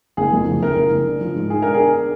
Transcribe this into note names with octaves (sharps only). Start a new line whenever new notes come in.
F#1 G#4
F2
F#1
F#1 A#4
F#1
F#1
D4
F3
G#2
G#3 G#4
D4 A#4
D4 G#4